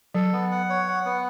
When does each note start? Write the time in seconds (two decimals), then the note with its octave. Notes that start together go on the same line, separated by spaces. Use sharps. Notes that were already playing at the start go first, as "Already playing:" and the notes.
0.14 F#3 A4
0.33 B3
0.51 F#5
0.70 C#5
0.88 F#5
1.05 B3